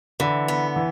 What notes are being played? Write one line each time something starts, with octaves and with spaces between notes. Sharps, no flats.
D3 E3
B3
E3